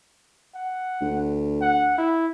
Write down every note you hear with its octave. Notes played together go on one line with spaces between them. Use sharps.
F#5
D2
F#5
E4